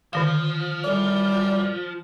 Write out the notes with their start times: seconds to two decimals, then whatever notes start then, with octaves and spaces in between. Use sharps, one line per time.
0.13 D3 D#3 F3 F5
0.84 F#2 A2 G3 D5